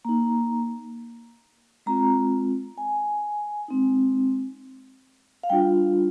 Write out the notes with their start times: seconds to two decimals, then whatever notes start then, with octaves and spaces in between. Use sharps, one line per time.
0.05 A#3 D#4 A#5
1.86 G#3 C4 F4 A#5
2.78 G#5
3.68 G#3 C4 D#4
5.43 F5
5.50 G3 D4 F4 G5